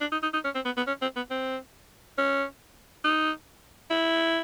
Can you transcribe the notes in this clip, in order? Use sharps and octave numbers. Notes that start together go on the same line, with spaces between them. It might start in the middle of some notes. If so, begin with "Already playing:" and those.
D4
D#4
D#4
D#4
C#4
C4
B3
B3
C#4
C4
B3
C4
C#4
D#4
E4